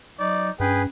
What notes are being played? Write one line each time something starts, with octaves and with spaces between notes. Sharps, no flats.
F#3 D#4 D5
G2 C#4 G#4 B4 G5